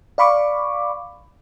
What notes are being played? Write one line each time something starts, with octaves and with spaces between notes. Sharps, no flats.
D5 F5 B5 C#6 D6